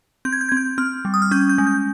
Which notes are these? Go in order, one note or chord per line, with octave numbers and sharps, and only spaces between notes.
C4 G6
G#6
G6
G#6
C4
G6
C4 F6
G3
D#6
F6
C#4 G6
G6
G#3
G6